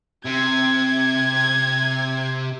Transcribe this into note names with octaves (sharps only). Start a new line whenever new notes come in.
C3 G#6